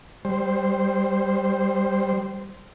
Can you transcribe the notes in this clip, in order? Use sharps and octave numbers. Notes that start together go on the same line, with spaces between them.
G3 C5